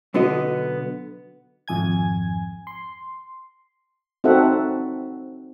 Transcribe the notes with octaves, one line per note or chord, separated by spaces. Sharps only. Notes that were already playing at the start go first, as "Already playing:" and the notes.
B1 D3 B3 F#4 D#5
G#1 F2 G#5 G#6
C6
C4 D#4 F#4 A4 E5 F#5